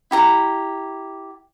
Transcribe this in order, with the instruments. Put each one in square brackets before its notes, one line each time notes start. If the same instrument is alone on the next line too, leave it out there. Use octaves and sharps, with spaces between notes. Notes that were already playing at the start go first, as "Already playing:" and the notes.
[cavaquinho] E4 G4 A#5